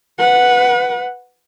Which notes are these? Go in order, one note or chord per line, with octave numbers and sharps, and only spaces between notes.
B4 F#5